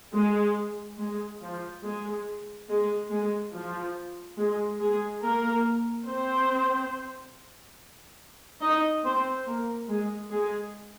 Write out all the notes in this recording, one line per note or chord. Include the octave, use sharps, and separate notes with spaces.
G#3
G#3
F3
G#3
G#3
G#3
F3
G#3
G#3 G#4
A#3 A#4
C4 C5
D#4 D#5
C4 C5
A#3 A#4
G#3 G#4
G#3 G#4